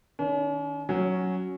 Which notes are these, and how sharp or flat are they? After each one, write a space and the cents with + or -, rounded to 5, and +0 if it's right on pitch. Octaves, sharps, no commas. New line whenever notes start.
D#3 +0 C#4 +45
F#3 +0 C#4 -5